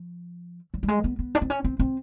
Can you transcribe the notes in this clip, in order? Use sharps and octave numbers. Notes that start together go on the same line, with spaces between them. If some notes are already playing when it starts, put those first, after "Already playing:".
Already playing: F3
F#3
G3
G#3
B3
B3
D4
C4
C#4
C4
C4